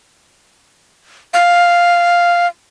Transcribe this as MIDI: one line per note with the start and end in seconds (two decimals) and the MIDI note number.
1.34 2.47 77